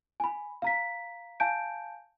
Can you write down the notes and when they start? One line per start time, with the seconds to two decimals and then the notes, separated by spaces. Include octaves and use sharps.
0.20 G#5 B5
0.62 F5 A#5 B6
1.40 F5 G#5 A5 G6 D7